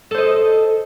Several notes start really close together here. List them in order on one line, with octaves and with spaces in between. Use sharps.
A4 C5 D#5